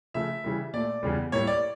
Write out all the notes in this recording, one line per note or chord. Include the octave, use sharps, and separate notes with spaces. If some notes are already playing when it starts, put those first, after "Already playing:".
C#3 F3 A3 E5
C#3 E3 G3
A#2 A3 D5
E2 C#3 G3
A2 G3 A#3 C#5
D5